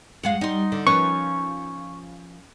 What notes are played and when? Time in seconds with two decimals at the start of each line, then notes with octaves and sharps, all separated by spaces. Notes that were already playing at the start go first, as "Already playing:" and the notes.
0.23 F2 G#3 F5 F#5
0.41 G3 D#4 C6
0.72 D3
0.87 F3 C#4 A#4 B4 C#6